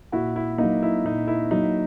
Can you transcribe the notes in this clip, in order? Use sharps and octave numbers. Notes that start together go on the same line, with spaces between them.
A#2 E4 F#4
E4
F#3 A#3 D#4
E4
A#2 D#4
E4
F#3 A#3 D#4